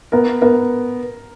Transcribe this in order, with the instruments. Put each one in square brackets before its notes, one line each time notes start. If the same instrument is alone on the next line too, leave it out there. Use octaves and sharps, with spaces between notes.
[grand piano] B3 [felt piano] A#4
[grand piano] B3 [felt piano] A#4